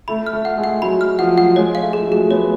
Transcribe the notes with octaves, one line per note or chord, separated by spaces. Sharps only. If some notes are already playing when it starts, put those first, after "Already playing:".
A3 B5
F6
A3
F#5
G#3
F#5
F#3 B5
F6
F3 F#5
F#3 F#5
G#3 C#5
F5
A3
G#4
F3
F#3
G#3 G#4
A3
B3 C#5